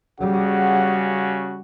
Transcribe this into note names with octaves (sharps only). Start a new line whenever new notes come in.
C#3 G3 F#4 F#5